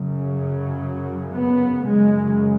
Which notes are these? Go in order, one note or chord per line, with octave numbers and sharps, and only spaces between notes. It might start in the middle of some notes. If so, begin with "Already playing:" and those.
Already playing: F#2 C#3
F#3
B3
F#2 C#3 G#3